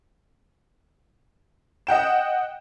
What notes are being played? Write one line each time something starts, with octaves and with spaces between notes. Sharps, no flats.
D#5 F#5 G5 E7